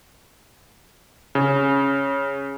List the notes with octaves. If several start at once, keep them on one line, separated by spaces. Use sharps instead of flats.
C#3